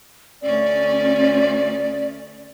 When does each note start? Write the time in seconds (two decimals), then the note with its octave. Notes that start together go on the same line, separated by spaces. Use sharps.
0.42 D2 C#4 D5